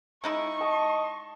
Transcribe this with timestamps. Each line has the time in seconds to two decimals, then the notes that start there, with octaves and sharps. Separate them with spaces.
0.24 G#3 D#4 E4 C#6
0.61 D#5 A5